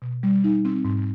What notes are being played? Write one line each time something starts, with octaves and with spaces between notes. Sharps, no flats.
B2
G3
D#4
C4
G#2